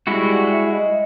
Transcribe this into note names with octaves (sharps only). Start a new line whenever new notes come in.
G3 G#3 E4 F#4
E5
D#5